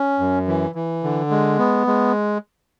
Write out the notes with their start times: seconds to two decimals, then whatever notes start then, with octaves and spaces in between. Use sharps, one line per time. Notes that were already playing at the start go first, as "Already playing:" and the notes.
Already playing: C#4
0.19 F#2
0.47 E3
0.75 E3
1.04 D3
1.30 G#3
1.59 B3
1.87 G#3